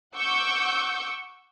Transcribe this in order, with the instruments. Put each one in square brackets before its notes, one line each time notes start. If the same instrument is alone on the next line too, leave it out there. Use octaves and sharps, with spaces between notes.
[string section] F#5 C#6 D6 E6 G6